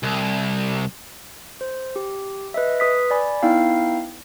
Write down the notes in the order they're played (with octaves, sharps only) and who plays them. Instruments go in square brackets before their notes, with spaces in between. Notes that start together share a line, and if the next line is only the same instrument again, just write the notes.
[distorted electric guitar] C2
[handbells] C5
G4
B4 D#5 E5
B4 D#6 B6
D5 G#5 B5
B3 D#4 E4 F5 G5